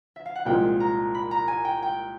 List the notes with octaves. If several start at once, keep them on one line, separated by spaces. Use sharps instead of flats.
E5
F5
F#5
C2 A#2 F3 G#3 G5
A#5
B5
A#5
G#5
G5
G5